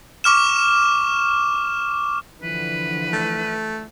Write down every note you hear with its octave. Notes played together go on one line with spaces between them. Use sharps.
C#6 D6 F6 E7
D3 E3 F3 B4
A3